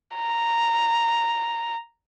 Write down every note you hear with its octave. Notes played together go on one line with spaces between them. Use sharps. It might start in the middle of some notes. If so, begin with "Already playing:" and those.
A#5